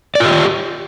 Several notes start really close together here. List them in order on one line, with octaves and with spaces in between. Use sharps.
D5 F4 G4